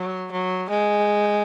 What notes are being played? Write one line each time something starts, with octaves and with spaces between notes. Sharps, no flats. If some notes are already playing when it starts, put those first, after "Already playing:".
Already playing: F#3
F#3
G#3